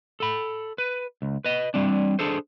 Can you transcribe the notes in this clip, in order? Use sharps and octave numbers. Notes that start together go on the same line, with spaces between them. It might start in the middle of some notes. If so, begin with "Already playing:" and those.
A4 B5
B4
C#2
B4 D#5
G3 C4 D4
D4 G#4 A4 C5